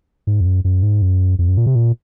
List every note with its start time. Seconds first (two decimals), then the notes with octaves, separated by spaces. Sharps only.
0.27 G#2
0.41 F2
0.46 F#2
0.64 F#2
0.83 G#2
1.02 F#2
1.39 F2
1.48 F#2
1.57 A#2
1.66 C3
1.75 A#2